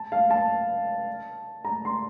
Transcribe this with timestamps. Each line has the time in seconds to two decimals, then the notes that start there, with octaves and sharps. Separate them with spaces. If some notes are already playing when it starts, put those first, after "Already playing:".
Already playing: A5
0.12 F5
0.30 A5
1.65 A#5
1.85 C6